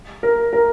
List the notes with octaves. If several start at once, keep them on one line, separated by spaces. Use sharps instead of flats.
A#4
A#4